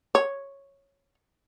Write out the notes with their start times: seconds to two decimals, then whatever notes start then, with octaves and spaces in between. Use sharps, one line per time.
0.15 C#5